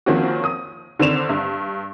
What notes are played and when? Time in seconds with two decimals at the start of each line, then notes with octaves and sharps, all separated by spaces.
0.06 D#3 F3 A#3 C4 C#4 F#4
0.44 D#6
0.99 D3 D#3 C4 D4 E7 F7
1.29 G2